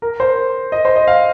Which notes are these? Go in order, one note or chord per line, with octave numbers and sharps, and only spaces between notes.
A#4
C5
D#5
C5
D#5
F5